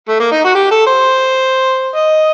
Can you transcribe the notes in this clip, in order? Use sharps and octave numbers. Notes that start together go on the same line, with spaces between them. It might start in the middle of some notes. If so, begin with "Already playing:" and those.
A3
A#3
D#4
F#4
G4
A4
C5
D#5